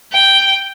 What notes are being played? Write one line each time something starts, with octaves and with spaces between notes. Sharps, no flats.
G5